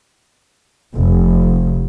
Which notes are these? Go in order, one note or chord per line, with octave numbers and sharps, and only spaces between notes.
F1